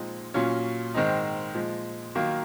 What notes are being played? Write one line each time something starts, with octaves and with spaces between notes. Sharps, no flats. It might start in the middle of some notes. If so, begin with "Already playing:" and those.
Already playing: A#2 F3 G#3 C4 D#4
A#2 F#3 C#4 F4
G#2 D#3 G#3 C4 D#4
A#2 F3 G#3
D#3 F#3 A#3 F4